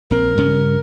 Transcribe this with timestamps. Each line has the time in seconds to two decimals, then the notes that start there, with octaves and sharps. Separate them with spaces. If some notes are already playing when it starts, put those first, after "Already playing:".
0.11 A#1 C4 A#4
0.37 G2 C#3 C#4